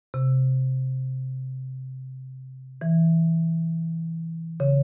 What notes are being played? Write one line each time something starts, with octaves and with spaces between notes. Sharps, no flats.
C3
E3
C#3